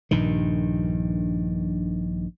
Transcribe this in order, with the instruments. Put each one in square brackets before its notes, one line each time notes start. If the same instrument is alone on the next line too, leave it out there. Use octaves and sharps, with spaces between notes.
[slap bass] A#1 G2 D#3